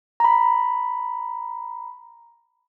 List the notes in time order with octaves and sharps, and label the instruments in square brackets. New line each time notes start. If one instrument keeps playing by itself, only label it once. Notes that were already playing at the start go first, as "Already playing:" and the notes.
[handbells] A#5 B5